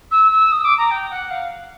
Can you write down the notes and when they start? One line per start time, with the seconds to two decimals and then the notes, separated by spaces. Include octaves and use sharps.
0.11 E6
0.32 E6
0.51 D#6
0.64 D6
0.78 A#5
0.91 G5
1.10 F#5
1.30 F5